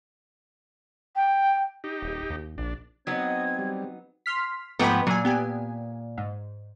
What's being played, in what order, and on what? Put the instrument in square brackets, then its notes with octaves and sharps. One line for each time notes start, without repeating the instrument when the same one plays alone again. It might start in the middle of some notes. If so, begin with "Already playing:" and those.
[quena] G5
[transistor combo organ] D#4 G4
[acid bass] D#1
D#2
[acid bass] A#1 [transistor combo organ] D4
[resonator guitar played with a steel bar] F#3 B3 D#4 [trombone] C4 [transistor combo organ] D#5 [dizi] G#6
[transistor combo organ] G3
[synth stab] C6 F6 B6
[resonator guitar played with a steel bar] G#2 F3 B3 [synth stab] A3 G5 B5
[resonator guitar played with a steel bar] A#2 [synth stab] F#3 G#5
[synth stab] B3 G4 G#5
G#2